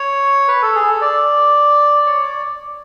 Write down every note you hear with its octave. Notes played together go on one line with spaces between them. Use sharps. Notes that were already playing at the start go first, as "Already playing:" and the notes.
Already playing: C#5
B4
A4
G#4
A4
D5
C#5
D5